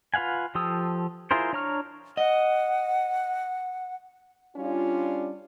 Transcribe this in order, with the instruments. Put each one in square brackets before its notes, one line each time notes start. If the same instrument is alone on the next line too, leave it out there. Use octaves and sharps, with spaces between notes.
[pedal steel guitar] F4 B4 F5 F#5 G#5
F3 G4 A4 D#6 E6
E4 F4 G#4 A#4 C5
D4 C#5 A#5 C#6 F6
[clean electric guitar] D#5 [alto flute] F#5
[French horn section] G3 C#4 D4 F4